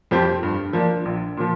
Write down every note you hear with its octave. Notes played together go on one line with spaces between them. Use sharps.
F2 F3 C4 G4
G2
F3 A#3 D4
A#1
A#2 F3